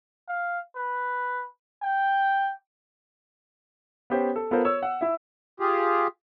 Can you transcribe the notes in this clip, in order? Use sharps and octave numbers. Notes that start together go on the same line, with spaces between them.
F5
B4
G5
B3 C#4 G4 C5
A4
B3 F4 A4 A#4 C5
C#5 E6
F#5
E4 E5
F4 G4 G#4